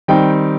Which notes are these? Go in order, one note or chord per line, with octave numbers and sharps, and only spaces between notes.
D#3 G3 C4 D#4 G5